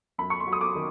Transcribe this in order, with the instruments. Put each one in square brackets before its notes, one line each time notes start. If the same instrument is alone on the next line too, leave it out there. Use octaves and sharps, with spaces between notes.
[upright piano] F#2 B5
C#6
C6
F#3
D#6
D6
D#3